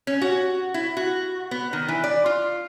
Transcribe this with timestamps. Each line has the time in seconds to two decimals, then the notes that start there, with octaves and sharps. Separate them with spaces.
0.07 C#4
0.22 F#4
0.74 E4
0.97 F#4
1.51 B3
1.73 D#3
1.88 E3
2.04 D5
2.26 F4